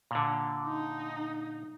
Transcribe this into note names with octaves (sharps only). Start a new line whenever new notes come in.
A#2 D3
D#4